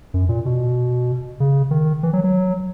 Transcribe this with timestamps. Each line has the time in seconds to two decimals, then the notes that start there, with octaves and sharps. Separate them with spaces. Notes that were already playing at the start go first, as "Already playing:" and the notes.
0.14 F#2
0.29 A#2
0.46 B2
1.40 C#3
1.71 D#3
2.03 E3
2.13 F#3
2.24 F#3